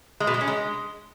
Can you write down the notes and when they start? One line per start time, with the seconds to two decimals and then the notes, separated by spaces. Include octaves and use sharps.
0.20 G#3
0.27 B2
0.34 G#3
0.41 C#4
0.47 G#3